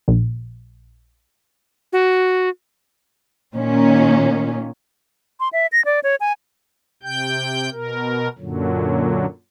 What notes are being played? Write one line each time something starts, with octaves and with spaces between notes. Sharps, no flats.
A#1
F#4
A#2 D#3 C#4
C6
E5
A#6
D5
C#5
G#5
C3 G5 G6
B2 A#4
F#2 A#2 D3 F#3